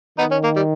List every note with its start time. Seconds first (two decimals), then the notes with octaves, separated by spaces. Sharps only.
0.18 D#3 B3 D#4
0.31 C#4
0.44 A#3
0.56 G3